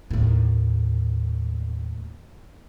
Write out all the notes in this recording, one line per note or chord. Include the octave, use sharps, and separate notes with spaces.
D#2 A2